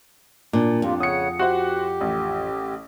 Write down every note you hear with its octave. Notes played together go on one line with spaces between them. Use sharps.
A#2 D4
F2 A#3 F4 G4
C#3 C#5 F#5 D#6 C#7
F#4 G4 C5 F#5
A1